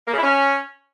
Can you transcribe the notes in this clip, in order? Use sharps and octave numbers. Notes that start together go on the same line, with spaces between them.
A#3
C#3
E4
C#4